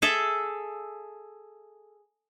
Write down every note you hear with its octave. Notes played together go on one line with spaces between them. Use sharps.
G#4 A4 E5